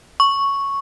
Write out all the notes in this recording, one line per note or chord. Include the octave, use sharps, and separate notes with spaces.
C#6